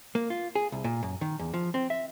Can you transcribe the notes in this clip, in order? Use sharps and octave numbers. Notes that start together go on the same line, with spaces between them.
A#3
F4
G#4
C2
A#2
F#2
D#3
E2
F3
C4
E5